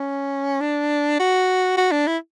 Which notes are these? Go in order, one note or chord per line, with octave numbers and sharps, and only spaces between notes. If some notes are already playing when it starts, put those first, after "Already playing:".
Already playing: C#4
D4
F#4
F#4
D4
E4